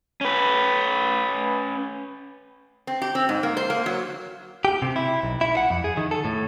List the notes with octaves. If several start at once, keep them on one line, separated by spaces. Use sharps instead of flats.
C#4 B4
C4
G4
C4
G#2
A#3
C5
A#3
F#3
G4
C3
E4
B1
E4
F#5
F2
G#4
D#3
A4
A2